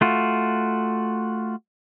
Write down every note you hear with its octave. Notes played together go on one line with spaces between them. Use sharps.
A3 F4 F#4